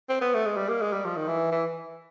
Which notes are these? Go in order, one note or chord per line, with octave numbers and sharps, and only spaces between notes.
C4
B3
A3
G#3
G3
A#3
G#3
G3
F3
D#3
E3
E3